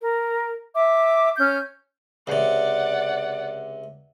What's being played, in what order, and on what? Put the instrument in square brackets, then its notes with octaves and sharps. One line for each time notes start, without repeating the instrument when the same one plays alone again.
[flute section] A#4
E5 D6
C#4 F6 G6
[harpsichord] C#2 C3 [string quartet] D5 F#5